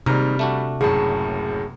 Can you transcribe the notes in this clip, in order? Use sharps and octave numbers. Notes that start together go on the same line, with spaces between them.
D#2 G#2 C3 G3 A#5 F6
A3 D4 F#4
F#1 F#2 A2 G#4 A5